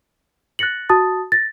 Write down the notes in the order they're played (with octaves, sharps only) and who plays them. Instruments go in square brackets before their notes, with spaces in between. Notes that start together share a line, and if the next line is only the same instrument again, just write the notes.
[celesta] F#6 A6 A#6 C#7 F#7
F#4 A5 D#6 A6
A6 A#6